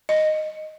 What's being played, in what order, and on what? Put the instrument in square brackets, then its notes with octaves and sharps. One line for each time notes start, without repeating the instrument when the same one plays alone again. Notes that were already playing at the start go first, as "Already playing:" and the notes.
[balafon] D#5